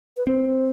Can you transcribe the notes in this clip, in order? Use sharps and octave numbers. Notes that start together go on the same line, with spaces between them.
B4
C4 C5